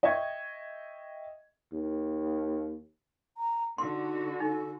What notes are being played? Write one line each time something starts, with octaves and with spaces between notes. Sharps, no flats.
D#5 E5 G5 C#6 G#6
D#2
A#5
D3 D#4 F#4 C6
D#4 A4